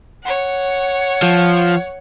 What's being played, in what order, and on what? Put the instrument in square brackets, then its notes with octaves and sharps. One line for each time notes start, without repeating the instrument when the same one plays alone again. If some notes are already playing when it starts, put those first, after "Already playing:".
[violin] C#5 F#5
[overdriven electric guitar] F3